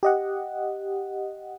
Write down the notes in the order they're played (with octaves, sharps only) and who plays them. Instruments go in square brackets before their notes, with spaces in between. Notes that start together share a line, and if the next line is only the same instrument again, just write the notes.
[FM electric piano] G4 D#5 F#5